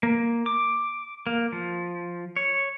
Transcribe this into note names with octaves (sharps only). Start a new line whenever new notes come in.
A#3
D6
A#3
F3
C#5